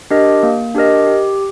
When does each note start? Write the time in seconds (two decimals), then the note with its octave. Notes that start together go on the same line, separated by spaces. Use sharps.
0.10 D4 G4 A#4 D#5
0.43 A#3
0.75 D4 G4 A#4 D#5
1.07 G4